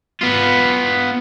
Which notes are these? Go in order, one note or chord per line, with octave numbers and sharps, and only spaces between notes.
B3 F4